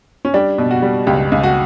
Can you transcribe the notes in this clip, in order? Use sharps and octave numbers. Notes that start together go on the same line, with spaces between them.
C#4
G3 D4
B2
F#4
G3
C#2 G4
C#2
F#4